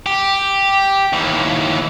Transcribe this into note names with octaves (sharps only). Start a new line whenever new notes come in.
G4
D#2 E3